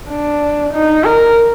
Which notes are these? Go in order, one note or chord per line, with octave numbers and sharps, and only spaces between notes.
D4
D#4
A#4